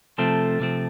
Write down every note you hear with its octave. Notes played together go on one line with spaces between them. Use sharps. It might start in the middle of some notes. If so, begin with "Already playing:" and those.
C3 F3 A3 C4 A4 A5
C3 F3 A3 C4